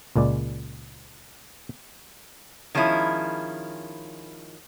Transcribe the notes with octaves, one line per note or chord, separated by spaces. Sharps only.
C#2 A#2 G#3 D5
D#3 F3 G#3 C#4 E4